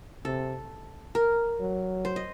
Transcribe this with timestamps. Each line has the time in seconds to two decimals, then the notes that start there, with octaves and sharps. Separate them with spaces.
0.25 C3 A4
1.15 A#4
1.60 F#3
2.05 C5
2.16 D#5